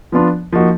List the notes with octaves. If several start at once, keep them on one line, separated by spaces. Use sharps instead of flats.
F3 B3 D4 F4
F3 A#3 D#4 F#4